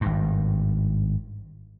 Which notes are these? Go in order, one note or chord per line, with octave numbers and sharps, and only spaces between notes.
G#1 G2